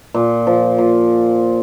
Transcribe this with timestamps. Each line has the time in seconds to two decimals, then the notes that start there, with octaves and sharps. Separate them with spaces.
0.14 A#2
0.47 F3
0.78 A#2